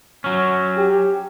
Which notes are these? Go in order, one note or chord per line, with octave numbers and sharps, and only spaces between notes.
F#3 C#4
G4